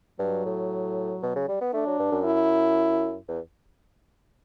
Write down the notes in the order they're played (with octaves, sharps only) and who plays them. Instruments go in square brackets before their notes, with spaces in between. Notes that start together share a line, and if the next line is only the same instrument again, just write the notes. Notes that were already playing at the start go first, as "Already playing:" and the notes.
[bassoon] G2 [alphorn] F#3
[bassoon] A2
B2
C#3
G3
B3
[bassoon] A3 [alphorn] D4
[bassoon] F#3
G2
F#2
[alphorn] E4
[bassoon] E2